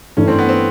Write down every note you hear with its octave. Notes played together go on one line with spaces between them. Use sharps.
G2 E3 A3 C#4
C4
B3
C4